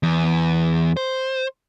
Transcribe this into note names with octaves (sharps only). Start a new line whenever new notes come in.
E2
C5